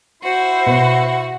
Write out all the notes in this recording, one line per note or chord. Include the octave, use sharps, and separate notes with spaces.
E4 F#4 C5
B2